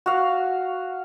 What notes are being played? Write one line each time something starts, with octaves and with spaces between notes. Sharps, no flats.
F#4 F5